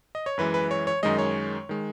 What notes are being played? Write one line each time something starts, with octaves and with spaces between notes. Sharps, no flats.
D#5
C#5
F#2 E3 G#3 B4
B4
C#5
C#5
F#2 D#3 G#3 D#5
C#5
D#3 G#3